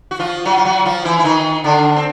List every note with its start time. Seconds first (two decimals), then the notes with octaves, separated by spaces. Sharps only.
0.11 F#4
0.19 F3 F4
0.45 F#3 F#4
0.57 F4
0.65 F#3 F#4
0.85 F3 F4
1.05 E3 E4
1.19 E4
1.24 D#3 D#4
1.64 D3 D4
1.96 C4